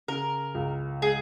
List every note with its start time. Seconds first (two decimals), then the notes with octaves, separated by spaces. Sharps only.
0.08 C#3 A#4
0.54 C#2
1.02 G#3 G#4